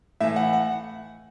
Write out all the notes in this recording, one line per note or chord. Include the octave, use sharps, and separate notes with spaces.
A2 E3 E5
F#5
F#5